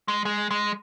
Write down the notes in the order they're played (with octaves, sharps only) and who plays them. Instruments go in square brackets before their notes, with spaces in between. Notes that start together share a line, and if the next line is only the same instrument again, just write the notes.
[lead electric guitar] G#3
G#3
G#3